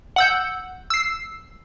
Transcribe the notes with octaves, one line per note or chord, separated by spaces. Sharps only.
F#5 E6 G6
E6 C7